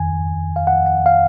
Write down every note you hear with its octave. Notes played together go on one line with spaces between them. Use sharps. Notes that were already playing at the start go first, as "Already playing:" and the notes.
Already playing: F2 D#3 G#5
F5
F#5
F#5
F5